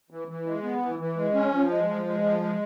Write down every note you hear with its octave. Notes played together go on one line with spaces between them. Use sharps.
E3
E3
G#3
B3
E3
E3
G#3
C#4
F3
G#3
F3
G#3
F3
G#3